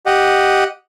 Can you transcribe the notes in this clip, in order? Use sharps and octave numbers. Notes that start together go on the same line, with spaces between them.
G4 D#5 F#5